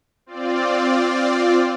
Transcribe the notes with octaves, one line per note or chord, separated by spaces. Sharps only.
C4 F4 D5